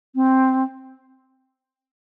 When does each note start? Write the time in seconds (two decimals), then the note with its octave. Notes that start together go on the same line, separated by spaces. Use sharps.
0.15 C4